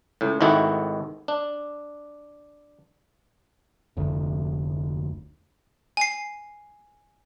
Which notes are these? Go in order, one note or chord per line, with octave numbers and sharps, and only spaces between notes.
C#2 A2
G#1 G#2 D#3 A3 E4 F#4
D4
F1 D2
G#5 C7